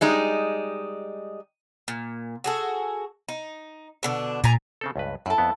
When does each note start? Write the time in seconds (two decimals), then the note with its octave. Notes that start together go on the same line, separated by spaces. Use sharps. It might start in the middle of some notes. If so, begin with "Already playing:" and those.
0.01 G3 G#3 D#4
1.88 A#2
2.44 F#4 G#4 A4
3.28 D#4
4.03 B2 D3 D4
4.44 A#2 G#5 A#5
4.81 C#3 C4 A4
4.96 C#2 G2 B4
5.26 F#2 E4 A4
5.38 F2 B3